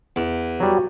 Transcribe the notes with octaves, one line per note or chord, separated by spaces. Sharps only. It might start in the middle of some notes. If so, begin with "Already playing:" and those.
E2
F#3 G3 F#4